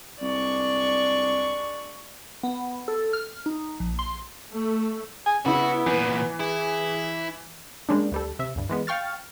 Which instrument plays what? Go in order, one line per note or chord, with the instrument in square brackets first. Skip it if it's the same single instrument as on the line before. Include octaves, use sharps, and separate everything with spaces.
[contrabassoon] C2 [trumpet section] G#3 D4 C#6 [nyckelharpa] D5
[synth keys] B3
A4
F6
D#4
A#1
C6
[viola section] A3
[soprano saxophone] G#5
[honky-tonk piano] C#3 E4 [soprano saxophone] B3 [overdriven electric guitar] F#4
[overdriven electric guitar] E2 A#2 [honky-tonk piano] E3
[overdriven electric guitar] E4 [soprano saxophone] G#4
[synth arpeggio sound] G3 G#3 A#3 C#4 D4
D2 G3 A4
C3 E5
D2 G2
E3 G#3 B3
F5 G5 C#6 F6 A6